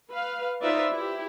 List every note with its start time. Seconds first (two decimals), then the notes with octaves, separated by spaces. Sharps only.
0.10 B4 F5
0.62 D#4 F4 B4 C5 D5 E5
0.92 E4 G4